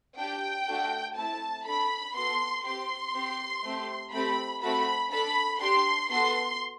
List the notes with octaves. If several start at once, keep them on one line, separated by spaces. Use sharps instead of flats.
D4 G4 G5
A3 D4 F#4 A4
A3 C4 E4 A5
D4 A4 B5
B3 F#4 A4 C6
C4 G4 C6
C4 G4
A3 C4 G4
A3 C4 G4 B5
A3 C4 F#4 A4 B5
D4 A4 B5
D4 G4 C6
B3 F#4 A4 C6